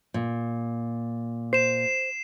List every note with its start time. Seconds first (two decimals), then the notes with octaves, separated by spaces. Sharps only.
0.14 A#2
1.53 C5 C7 E7